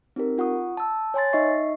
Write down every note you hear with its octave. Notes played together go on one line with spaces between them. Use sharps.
C4 D#4 G4 A#4
F4 F#5 C#6 D#6
A5 E6
C#5 G#5 C6 A6
D#4 D#5 E5 C#6 C7